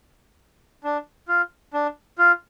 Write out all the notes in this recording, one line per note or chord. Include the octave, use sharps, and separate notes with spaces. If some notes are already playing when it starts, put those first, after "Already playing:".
D4
F4
D4
F4